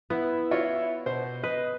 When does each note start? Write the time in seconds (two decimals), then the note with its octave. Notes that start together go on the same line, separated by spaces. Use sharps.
0.10 B3 E4
0.51 F4 F#4 C#5 D5
1.06 B2 C5
1.43 B4 D#5